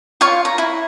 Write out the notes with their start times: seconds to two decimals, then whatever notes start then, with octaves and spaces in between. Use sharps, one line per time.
0.21 F4 C#5 F5 C#6
0.45 A#5
0.58 E4